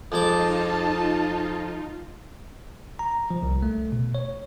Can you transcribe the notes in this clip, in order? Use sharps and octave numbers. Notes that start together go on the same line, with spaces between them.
F2 G#3 D#4 F4 A5 D6
A#5
F3
C2
A3
B2
C#5